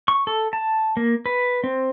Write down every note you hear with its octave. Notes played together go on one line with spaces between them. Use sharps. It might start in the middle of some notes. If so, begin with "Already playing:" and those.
C#6
A4
A5
A#3
B4
C4